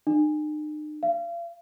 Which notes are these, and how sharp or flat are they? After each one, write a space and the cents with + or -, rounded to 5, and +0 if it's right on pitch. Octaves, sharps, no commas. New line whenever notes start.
D#4 -45
F5 -35